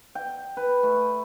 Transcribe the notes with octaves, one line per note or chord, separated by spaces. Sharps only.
G5
B4
A3